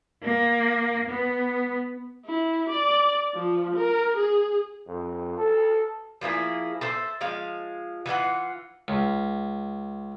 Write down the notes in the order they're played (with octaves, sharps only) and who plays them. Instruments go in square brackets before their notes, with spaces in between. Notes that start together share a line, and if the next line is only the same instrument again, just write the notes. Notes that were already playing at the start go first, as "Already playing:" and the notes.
[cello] A#3
B3
[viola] E4
D5
F3
A#4
G#4
[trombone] F2
A4
[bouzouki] F3 A#3 E4 G#4
A4 C5 E5
F3 G#3 F5
E3 F4 C#5 F#5
[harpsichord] C#2